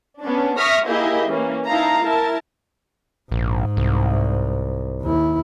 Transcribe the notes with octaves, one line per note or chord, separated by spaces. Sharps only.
B3 C#4 D4
E5 C#6 D#6 F6 A#6 B6
A#3 E4 G4 G#4 D#5 E5
E3 A#3 C#4
D#4 E4 F5 A5 A#5
E4 A#4 A5
A#1 G#2
C2
D#2 E4